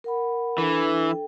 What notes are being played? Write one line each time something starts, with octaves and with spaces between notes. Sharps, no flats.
A#4 F#5 B5
E3 D4 A4
A4 G5